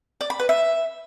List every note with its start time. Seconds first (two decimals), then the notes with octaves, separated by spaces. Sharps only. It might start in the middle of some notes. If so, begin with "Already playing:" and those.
0.21 D5
0.30 B5
0.40 B4
0.49 E5